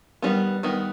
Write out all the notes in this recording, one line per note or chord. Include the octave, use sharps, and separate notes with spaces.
D#3 G3 B3
D#3 G3 B3